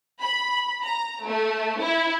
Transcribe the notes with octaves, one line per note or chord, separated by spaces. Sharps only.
B5
A#5
A3
E4